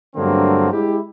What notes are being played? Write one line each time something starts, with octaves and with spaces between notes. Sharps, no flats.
G2 D3 F#3 A3 A#3 C4
G#3 E4 G4